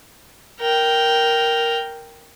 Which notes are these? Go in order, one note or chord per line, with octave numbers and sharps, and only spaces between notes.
A#4 G5